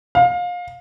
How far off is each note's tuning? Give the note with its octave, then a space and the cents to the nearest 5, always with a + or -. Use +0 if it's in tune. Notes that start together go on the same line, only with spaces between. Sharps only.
F5 +25